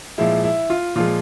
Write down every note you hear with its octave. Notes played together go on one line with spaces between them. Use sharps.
A#2 F3 G#3 E4
E4
F4
A#2 F3 G#3 F4